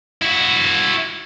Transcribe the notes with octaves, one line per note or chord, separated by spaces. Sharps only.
E4 F#4